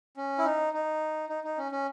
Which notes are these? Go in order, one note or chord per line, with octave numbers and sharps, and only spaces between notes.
C#4
E4
D#4
D#4
D#4
D#4
C#4
C#4